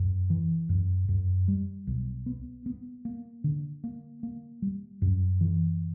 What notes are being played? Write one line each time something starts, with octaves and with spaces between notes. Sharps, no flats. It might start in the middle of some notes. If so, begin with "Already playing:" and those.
Already playing: F#2
E3
F#2
F#2
G3
B1
B3
B3
A#3
D3
A#3
A#3
G3
F#2
E3